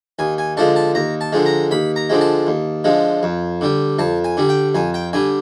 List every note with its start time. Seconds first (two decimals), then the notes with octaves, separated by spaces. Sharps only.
0.19 D#2 G#5
0.38 G#5
0.57 D3 F3 G#3 A5
0.76 A5
0.95 D#2 A#5
1.21 A5
1.33 D3 F3 G#3
1.46 A#5
1.71 D#2 B5
1.96 A#5
2.10 D3 F3 G#3
2.21 A5
2.47 D#2
2.84 D3 F3 G#3
3.23 F2
3.61 D3 G3
3.99 F2 A5
4.24 G#5
4.37 D3 G3
4.49 G5
4.75 F2 G#5
4.94 G5
5.13 D3 G3 G#5